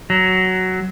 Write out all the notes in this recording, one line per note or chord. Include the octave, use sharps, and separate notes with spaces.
F#3